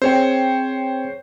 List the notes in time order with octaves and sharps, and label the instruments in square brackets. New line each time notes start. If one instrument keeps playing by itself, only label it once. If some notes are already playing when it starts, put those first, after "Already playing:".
[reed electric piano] C4 G#4 [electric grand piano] C5 C#5 G5